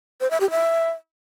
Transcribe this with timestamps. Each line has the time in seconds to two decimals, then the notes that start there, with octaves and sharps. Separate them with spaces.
0.21 C5
0.31 E5
0.41 G4
0.50 E5